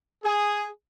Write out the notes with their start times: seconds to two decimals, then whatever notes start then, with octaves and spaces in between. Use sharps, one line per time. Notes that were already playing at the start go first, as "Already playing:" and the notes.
0.24 G#4